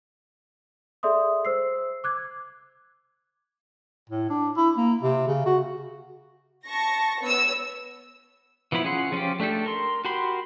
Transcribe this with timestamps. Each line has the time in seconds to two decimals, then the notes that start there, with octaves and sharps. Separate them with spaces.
1.03 G#4 A4 D5 E5 C6 D#6
1.45 C5 E6 C7
2.04 D6 F#6 G#6
4.10 A2
4.30 D4
4.57 E4
4.77 A#3
5.02 C3
5.28 C#3
5.46 F#4
6.65 A5 C#6 A#6
7.22 B3 C#5 E6
8.72 E3 F3 B3 E4 B5
8.84 C#4 F4 G#4 F#5 C6
9.12 F3 C#4 F4 G4
9.40 A3 D4 G4 A4
9.66 A#4 C6
10.05 F#4 G4 A#4 B5 C6